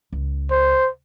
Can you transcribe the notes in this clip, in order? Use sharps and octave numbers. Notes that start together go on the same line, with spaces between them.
C#2
C5